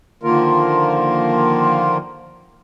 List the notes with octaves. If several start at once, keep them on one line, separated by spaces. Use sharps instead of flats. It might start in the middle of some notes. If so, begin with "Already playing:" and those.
D3 D#3 F3 A#3 F4 A#4